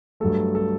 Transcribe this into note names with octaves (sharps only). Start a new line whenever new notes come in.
G2 F#3 A3 A4
A4